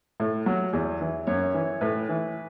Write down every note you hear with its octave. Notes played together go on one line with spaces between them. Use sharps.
A2
F#3
E2
E3
F#2 C#5
E3
A2 B4
E3